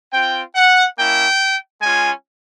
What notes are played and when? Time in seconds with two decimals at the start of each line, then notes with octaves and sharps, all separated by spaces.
0.13 C4 F4 G5
0.55 F#5
0.97 A#3 C#4 E4 G5
1.81 G#3 C#4 F4 G#5